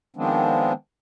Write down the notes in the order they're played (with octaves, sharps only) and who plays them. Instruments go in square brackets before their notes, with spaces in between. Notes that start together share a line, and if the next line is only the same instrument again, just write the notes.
[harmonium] D#3 F3 G#3 B3 C4 D4